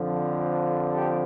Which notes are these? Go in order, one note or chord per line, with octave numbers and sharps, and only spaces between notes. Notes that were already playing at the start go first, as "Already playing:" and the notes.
Already playing: F2 D3 F3
G4 A4